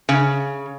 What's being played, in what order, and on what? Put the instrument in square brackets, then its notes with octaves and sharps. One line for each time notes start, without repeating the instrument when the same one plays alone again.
[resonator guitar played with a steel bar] C#3